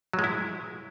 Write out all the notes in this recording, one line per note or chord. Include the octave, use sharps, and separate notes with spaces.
F#3
G#3
E4